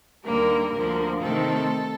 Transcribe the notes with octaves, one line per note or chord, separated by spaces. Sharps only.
D#2 D3 G3 A#3 A#4
D2 D3 F3 A#3
C3 D#3 A3 C4 A4